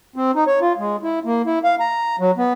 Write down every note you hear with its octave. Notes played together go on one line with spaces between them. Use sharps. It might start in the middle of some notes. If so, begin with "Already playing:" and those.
C4
D#4
C#5
F4
G#3
E4
A#3
E4
F5
A#5
F#3
B3